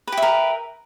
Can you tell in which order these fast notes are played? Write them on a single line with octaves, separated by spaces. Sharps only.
B4 G4 E5 A#4